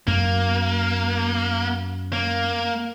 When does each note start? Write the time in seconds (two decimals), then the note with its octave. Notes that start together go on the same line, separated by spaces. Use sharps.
0.08 F#2 A#3
2.13 A#3